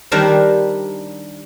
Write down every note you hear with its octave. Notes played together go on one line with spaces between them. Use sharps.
D#3 G3 D4 A#4 C5